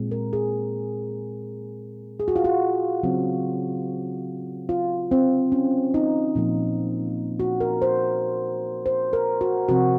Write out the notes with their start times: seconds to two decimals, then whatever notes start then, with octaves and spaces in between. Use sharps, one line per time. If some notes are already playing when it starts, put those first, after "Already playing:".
Already playing: A#2 G#3 C4
0.11 A#4
0.33 G#4
2.20 G#4
2.28 F#4
2.36 F4
2.44 F#4
3.03 C#3 F#3 C4
4.69 F4
5.11 C4
5.52 C#4
5.94 D#4
6.35 A#2 F3 A#3
7.40 F#4
7.60 A#4
7.82 C5
8.86 C5
9.13 A#4
9.41 F#4
9.69 C3 F3 C4 F#4